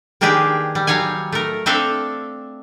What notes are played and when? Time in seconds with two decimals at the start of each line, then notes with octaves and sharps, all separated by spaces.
0.21 D#3 A#3 D4 G4 G#4 B4
0.75 G3
0.87 F#3 G3 C#5 F5 G#5
1.32 A3 A#4
1.66 C4 D4 A4 E5 F5